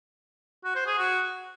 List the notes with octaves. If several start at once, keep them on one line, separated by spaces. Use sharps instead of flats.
F#4
C5
G#4
F#4